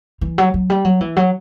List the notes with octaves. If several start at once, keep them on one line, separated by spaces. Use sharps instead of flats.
E3
F#3
F#3
G3
F#3
E3
F#3